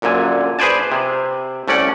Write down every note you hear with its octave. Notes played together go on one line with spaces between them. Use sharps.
A#1 F#2 A#2 D3 G#5
G#4 B4 C5 D5 G#5 A5
C3
C2 A3 C#4 D5 F#5